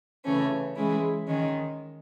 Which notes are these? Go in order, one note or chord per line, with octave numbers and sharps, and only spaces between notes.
C#3 E3 A3 C#4
E3 G#3 C#4 E4
D#3 G#3 C#4